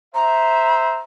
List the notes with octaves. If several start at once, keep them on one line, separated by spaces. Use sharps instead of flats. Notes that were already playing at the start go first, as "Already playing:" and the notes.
C5 E5 A#5